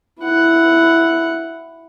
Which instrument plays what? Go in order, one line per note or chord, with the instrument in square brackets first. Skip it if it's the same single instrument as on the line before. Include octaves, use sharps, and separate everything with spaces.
[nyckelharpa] E4 F#5